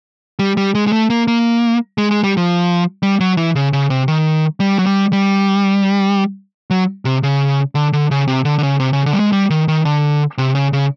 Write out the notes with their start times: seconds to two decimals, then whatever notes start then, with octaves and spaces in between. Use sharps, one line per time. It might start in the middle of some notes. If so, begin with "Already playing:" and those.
0.39 G3
0.57 G3
0.75 G#3
0.87 G#3
0.92 A3
1.10 A#3
1.28 A#3
1.98 G#3
2.11 G#3
2.24 G3
2.37 F3
3.03 G3
3.20 F#3
3.37 E3
3.55 C#3
3.73 C#3
3.90 C3
4.08 D#3
4.60 G3
4.79 F#3
4.86 G3
5.13 G3
6.70 F#3
7.05 C3
7.23 C#3
7.75 D3
7.93 D3
8.11 C#3
8.28 C3
8.45 D3
8.58 D3
8.63 C#3
8.80 C3
8.93 C#3
9.06 D3
9.13 G3
9.20 G#3
9.33 G3
9.50 D#3
9.68 D#3
9.85 D3
10.38 C3
10.55 C#3
10.73 C#3